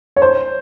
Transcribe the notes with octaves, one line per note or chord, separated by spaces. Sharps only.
C#5
C5